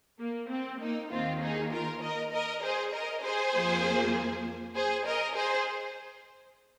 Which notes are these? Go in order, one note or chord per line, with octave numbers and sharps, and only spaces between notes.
A#3
C4
A#3 D#4
D#2 D#3 A#3 C4 F4
D#4 G#4
F4 A#4
A#4 D#5
A#4 D#5
G#4 C5
A#4 D#5
G#4 C5
F2 F3 A#3
G#4 C5
A#4 D#5
G#4 C5